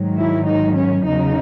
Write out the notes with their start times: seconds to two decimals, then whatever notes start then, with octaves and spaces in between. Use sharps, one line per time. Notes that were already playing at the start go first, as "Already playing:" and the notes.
Already playing: G#2 D#3 F#3
0.17 E4
0.46 D#4
0.76 C#4
1.06 E2 C#3 F#3 D#4